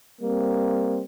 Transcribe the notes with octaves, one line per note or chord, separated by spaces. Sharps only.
G3 A#3 C4